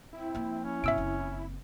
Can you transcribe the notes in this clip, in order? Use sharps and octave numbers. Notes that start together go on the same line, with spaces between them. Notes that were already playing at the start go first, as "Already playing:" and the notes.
C4 E4
F3 A#3
C#4
G2 B2 E5 E6 D7
F#1 C4